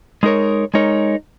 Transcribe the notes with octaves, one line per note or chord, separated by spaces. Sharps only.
G#3 D#4 A#4 C#5
G#3 D#4 A#4 C#5